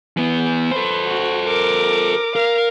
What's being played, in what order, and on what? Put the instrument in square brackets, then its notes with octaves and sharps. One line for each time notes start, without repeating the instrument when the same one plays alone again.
[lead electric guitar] E3 B3
[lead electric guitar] A4 C5 [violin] B4
[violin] F#4
A#4 D6
[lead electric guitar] A#4 [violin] F5